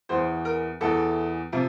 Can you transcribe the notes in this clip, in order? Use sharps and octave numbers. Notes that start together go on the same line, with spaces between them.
E2 E3 C5
A#4
E2 E3 A4
C3 F3